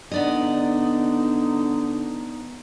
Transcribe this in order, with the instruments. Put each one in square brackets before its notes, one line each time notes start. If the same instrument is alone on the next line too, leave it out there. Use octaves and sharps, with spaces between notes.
[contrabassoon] D3 [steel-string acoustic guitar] B3 D5 D#5 [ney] D#4